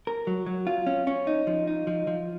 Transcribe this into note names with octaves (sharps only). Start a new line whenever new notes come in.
A#4
F#3
F#3
F4
C#4
C#4
D#4
F3
D#4
F3
F3